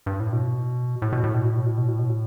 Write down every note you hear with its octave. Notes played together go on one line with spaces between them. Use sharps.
G2
A2
B2
A2
B2
A2
B2
A2
B2
A2
B2
A2
B2
A2